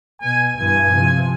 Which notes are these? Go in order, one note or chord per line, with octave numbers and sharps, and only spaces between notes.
B2 G#5
G2 E3 G#5
C3 F3